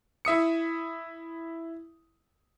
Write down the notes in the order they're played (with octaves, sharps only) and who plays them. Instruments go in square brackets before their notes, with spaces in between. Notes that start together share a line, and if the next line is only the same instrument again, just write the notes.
[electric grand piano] E4 E5 D#6 C#7